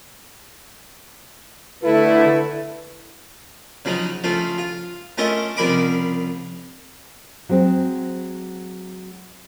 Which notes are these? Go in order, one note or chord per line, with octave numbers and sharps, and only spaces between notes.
D3 A3 E4 A4 B4
C#3 F3 F#3 D#4
C#3 F3 A3 F4
F4
A3 C#4 F4 A4 A#4 D#5
C2 C#3 F3 A#4 B5 D6
F#3 G#3 C4